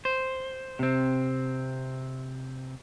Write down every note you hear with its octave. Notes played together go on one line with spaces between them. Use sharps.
C5
C3 C4